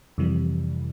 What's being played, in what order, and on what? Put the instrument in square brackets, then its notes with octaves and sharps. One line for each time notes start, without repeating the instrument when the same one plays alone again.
[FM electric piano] F2 C3 E3 G3